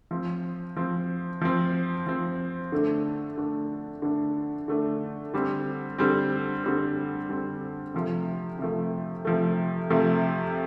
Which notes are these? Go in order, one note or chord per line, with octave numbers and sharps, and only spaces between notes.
F3 C4
F3 C4
F3 C4
F3 C4
D3 A3 D4
D3 A3 D4
D3 A3 D4
D3 A3 D4
D3 G3 C4
D3 G3 C4
D3 G3 C4
D3 G3 C4
C3 F3 A3
C3 F3 A3
C3 F3 A3
C3 F3 A3